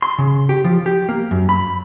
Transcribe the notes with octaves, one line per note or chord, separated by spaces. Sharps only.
C6
C#3
G4
F3
G4
A#3
F#2
B5